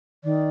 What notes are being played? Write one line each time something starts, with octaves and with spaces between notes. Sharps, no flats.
D#3 D5